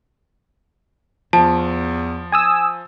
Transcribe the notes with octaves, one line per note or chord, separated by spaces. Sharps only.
E2 F3 A5
G#5 D#6 E6